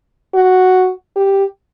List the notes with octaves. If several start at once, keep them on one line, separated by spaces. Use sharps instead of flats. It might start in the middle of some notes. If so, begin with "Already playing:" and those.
F#4
G4